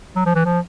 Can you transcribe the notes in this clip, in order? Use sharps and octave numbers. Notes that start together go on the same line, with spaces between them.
F#3
F3
E3
F3